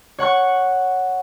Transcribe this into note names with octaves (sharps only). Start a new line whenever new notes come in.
C#5 F#5 C#6 F#6